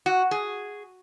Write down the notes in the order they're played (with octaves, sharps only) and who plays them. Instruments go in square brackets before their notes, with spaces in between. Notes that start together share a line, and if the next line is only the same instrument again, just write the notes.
[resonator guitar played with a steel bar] F#4
G#4